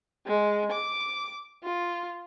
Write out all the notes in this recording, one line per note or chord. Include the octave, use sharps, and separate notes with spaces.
G#3
D6
F4